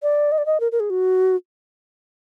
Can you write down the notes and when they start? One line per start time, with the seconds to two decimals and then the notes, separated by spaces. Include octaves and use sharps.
0.02 D5
0.32 D#5
0.38 D5
0.46 D#5
0.60 A#4
0.72 A#4
0.80 G#4
0.90 F#4